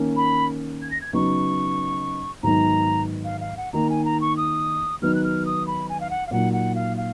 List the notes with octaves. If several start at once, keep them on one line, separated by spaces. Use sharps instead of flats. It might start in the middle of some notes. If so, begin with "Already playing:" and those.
Already playing: D#3 A#3 C#4
B5
G#6
A#6
G#6
C#3 F#3 B3 D#4 C#6
G#2 D#3 F#3 B3 D#4 A#5
F5
F5
F#5
D#3 A#3 D#4 A#5
G#5
A#5
C#6
D#6
D#3 F#3 B3 D#4 F6
F#6
F6
D#6
B5
G#5
F5
F#5
F5
A#2 F#3 A#3 D#4 F#5
F#5
F5
F5